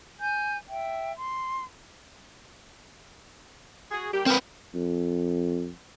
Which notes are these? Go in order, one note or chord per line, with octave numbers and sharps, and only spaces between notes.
G#5 G6
E5 G5
C6
F#4 G#4
G3 A#3 G4
C4 A#4 B4
F2